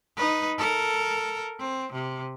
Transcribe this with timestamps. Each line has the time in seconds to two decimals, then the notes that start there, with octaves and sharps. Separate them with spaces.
0.17 D#4 B4
0.58 A4 A#4
1.59 C4
1.93 C3